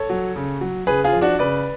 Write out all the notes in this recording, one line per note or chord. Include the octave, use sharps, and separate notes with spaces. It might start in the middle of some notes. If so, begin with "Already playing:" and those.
Already playing: A4 C#5
F#3
C#3
F#3
C#3 G#4 B4
F4 G#4
F3
D4 F#4
C#3 B4 D5